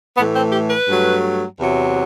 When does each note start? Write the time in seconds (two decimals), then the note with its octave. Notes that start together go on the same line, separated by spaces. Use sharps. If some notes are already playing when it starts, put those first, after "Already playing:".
0.17 A2 E3 A3 B3
0.36 C4
0.52 G4
0.70 B4
0.87 G2 F#3 A3
1.59 E2 C3 F#3